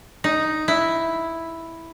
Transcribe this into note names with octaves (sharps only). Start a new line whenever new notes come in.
D#4
E4